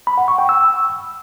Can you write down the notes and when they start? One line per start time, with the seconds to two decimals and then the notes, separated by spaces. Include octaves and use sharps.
0.07 B5
0.18 F#5
0.28 C#6
0.38 G5
0.49 E6